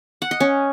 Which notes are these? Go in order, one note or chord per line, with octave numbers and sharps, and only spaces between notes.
F#5
D#5
C#4